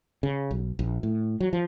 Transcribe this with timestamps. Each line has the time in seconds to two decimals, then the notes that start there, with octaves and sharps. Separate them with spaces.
0.23 C#3
0.51 B1
0.79 A#1
1.03 A2
1.40 F#3
1.53 F3